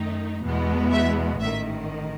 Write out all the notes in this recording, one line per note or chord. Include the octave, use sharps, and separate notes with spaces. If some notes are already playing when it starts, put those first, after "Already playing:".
Already playing: F#2 D#3 A3 D#4
E2 B2 G#3 B3
E5
A1 G#2 D#3 E5